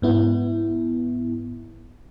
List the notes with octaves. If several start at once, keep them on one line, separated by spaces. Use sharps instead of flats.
G#2 B3 E4